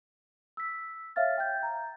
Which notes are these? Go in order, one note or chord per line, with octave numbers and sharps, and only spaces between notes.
E6 B6
C#5 E5 F5 F6 A6
G5 G6
A#5